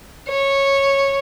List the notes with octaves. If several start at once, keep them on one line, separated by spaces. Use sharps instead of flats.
C#5